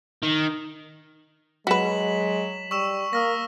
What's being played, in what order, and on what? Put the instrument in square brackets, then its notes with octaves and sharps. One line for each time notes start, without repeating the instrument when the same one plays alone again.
[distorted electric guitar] D#3
[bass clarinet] F#3 [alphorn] G#3 [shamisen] F#4 B4 [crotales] B6 E7 F#7
[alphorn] G3 [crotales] C#6 E6 E7
[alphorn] A#3 [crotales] D#6 F6 A#6